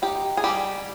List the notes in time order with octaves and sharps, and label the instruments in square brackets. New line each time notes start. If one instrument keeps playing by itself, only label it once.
[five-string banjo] D#4 G4
G#4
G3 G4